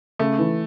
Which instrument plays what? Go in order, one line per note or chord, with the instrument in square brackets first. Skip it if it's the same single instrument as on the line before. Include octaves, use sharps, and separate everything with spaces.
[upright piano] C#3 [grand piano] A3
[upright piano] E3